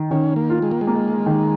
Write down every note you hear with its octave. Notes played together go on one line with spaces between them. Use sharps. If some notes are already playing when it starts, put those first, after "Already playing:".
Already playing: D#3
D#3 C#4
A#3
F4
G#3
A#3
G#3
A#3
D#3